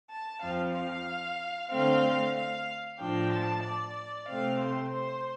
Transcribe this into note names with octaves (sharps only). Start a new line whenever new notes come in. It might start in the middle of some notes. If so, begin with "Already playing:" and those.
A5
F2 F3 C4 F5
F5
D3 A3 C4 F5
F5
A2 F3 D4 G5
A5
D5
C3 A3 C4 F5
C5
C5